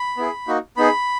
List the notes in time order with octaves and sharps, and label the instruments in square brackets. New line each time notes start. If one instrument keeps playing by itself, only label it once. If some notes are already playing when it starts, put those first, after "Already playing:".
Already playing: [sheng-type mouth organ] B5
B3 E4 G#4
A#3 D#4 F#4
B3 D#4 G#4 B5